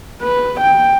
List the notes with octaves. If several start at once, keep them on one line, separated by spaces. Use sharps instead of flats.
B4
G5